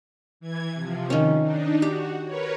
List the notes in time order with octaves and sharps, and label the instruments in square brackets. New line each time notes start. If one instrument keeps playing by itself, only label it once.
[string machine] E3 G#6
C3 F3
[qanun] D#3 C#4
[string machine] D4 D#4
[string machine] F#4 [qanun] G4
[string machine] A#4 B4 C#5